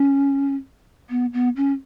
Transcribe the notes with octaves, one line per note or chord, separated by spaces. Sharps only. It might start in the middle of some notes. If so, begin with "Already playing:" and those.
Already playing: C#4
B3
B3
C#4